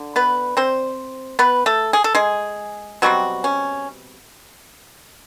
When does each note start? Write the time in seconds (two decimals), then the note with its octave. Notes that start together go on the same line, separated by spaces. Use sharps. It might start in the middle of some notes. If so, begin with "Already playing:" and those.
Already playing: D3
0.16 B3 B4
0.57 C4 C5
1.39 B3 B4
1.66 A3 A4
1.93 G#4
2.04 A4
2.15 G#3 G#4
3.02 B2 F#3 G3 C4 F#4
3.44 C#4